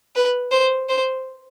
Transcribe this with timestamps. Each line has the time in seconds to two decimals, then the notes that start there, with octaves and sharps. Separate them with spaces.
0.16 B4
0.51 C5
0.89 C5